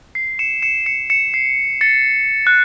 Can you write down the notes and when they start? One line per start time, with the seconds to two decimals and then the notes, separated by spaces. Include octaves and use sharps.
0.15 C7
0.39 C#7 E7
0.62 C#7 E7
0.86 C#7 E7
1.10 C#7 E7
1.34 C7
1.81 A6 C#7
2.47 F#6